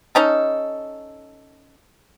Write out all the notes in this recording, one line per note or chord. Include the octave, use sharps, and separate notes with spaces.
C#4 D#4 A4